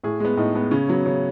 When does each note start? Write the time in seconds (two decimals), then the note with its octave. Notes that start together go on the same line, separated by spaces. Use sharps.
0.04 A2 G#4
0.20 G#3 B3
0.37 A2 D#4
0.55 G#3 B3
0.71 C#3 C#4
0.88 F#3 B3
1.06 C#3